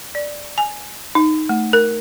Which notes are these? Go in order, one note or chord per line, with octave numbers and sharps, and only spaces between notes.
D5
G#5
D#4
A3
A#4